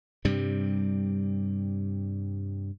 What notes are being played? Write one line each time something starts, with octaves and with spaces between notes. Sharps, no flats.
G2 C3 G3